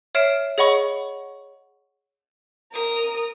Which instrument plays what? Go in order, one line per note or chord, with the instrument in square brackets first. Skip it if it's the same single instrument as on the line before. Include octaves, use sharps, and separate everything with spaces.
[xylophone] C#5 E5 F6 C7 D7 E7
G#4 C#5 D#5 F#5 B5 C#6
[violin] A#4 D#6